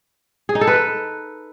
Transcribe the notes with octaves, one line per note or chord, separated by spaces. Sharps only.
G#4
D#4
A4
B4